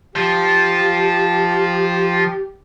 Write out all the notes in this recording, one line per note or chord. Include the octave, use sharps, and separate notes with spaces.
F3 G4